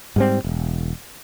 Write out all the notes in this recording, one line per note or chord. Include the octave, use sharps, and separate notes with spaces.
G#2 G3 C4
E1